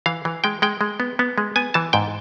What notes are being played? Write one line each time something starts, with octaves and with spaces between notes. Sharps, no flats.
E3 F5
E3
G#3 G5
G#3 G5
G#3
B3
B3
G#3
B3 G#5
E3 A5
G#2 G5